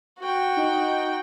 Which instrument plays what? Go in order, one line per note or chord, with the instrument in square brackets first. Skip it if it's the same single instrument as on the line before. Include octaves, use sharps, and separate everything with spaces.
[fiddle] F#4 G5
[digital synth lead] D#4